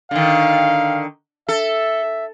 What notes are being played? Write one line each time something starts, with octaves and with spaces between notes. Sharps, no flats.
D3 D#3 F5
A4 E5